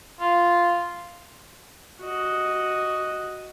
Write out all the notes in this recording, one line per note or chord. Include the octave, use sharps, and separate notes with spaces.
F4
F#4 D#5